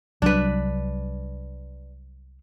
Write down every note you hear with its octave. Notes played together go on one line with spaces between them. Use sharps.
C2 F#3 G3 D4 B4